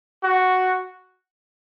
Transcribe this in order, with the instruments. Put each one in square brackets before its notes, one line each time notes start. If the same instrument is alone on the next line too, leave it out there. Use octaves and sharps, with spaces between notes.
[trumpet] F#4